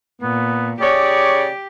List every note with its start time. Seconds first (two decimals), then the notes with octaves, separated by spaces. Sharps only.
0.22 A#2 B3
0.81 C#3 G4 C#5 D5